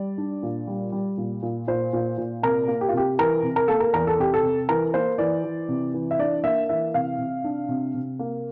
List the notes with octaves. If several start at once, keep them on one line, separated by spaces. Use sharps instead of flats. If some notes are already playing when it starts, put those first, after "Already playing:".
Already playing: G3 D5
D4
A#2
G3
G3
A#2
A#2
A#2 C5
A#2
A#2
C3 A#4
A#3
G4
F4
C3 G4
E3 A#4
C3
A#4
A#3 A4
A#4
E2 A#4
A4
C3 G4
A4
C3
E3 A#4
A#3 C5
E3 D5
E3
C3
E3
E5
D4 D5
A#3 E5
E3 E5
C3 F5
C3
D4
C3
C3
A#3